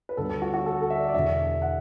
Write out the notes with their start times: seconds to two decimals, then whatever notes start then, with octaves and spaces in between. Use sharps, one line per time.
0.09 B4
0.17 D2 D3 G3 B3 A4
0.29 A4
0.42 F#4
0.54 F#4
0.66 A4
0.82 A4
0.90 E5
0.98 D5
1.08 D5
1.14 E1 E2 D3 E5
1.62 F#5